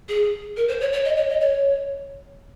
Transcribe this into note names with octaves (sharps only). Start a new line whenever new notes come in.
G#4
A#4
C5
C#5
C#5
D#5
C#5
D#5
C#5